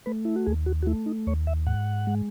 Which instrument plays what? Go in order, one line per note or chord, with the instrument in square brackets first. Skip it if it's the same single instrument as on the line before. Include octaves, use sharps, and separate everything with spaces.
[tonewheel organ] A3 B4
E4
F#4
D#2 G#4
F#4
F#4
A3 E4
D#4
D#2 C#5
E5
G#2 F#5
G#3